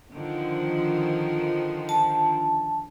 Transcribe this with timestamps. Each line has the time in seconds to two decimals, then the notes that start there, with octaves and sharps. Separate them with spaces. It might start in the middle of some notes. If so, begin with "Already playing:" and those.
0.13 D3 D#3 F3
1.89 A5